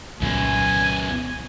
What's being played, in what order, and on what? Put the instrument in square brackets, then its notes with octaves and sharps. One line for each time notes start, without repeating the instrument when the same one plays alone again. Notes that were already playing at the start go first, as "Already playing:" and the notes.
[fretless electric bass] C2 A#2 C#3 [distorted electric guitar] F#2 B3 [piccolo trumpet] G#5